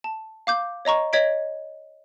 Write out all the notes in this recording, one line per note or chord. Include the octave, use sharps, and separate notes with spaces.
A5
F5 D6 G6
C#5 D#5 A#5 C#6
C#5 D#5 G#6 B6 D7